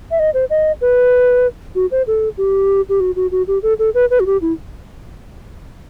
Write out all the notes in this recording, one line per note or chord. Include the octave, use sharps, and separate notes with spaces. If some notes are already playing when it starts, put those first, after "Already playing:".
E5
D#5
C5
D#5
B4
F#4
C5
A4
G4
G4
F#4
F#4
F#4
G4
A4
A4
B4
B4
F#4
G4
E4